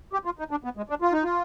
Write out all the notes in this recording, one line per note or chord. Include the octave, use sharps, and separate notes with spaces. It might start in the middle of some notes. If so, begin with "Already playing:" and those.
G4
F4
D#4
D4
B3
G#3
D4
F4
D#4
F4